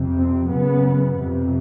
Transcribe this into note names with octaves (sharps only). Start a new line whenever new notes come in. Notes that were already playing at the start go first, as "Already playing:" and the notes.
Already playing: F2 C3
C4
F#2 C#3 B3
F2 C3